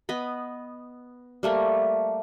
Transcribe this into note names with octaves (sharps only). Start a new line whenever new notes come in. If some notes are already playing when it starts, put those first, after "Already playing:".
B3 D#5 B5
G3 A3 A#3